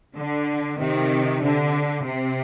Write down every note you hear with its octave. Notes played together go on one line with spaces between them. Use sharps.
D3
C3 D#3
D3
C3